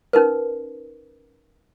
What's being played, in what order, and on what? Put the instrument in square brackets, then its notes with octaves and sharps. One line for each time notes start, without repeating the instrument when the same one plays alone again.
[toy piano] C#4 D#4 A#4 B4